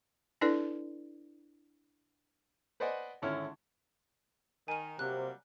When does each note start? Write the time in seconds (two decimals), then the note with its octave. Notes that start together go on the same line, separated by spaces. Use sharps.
0.41 D4 E4 A4 B4 D5
2.80 B4 C5 D5 D#5 F#5 G#5
3.22 G#1 D3 C#4 E4 F6
4.68 D#3 G#5 D#7
4.99 C3 F#3 G3 A#3 F#6